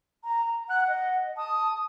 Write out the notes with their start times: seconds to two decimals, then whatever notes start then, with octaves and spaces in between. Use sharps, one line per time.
0.24 A#5
0.69 F#5 F#6
0.87 D#5
1.37 A5 D#6